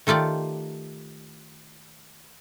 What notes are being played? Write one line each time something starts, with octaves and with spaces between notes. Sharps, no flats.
D#3 A3 F4 G4 D5